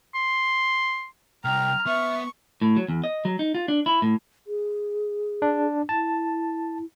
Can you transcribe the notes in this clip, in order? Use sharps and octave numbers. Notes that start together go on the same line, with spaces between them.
C6
C2 G5 A#5 F6
B3 E5 C#6
A2
F#3
E2
D#5
F#3
D#4
F4
D4
E4
A2
G#4
D4
E4 A5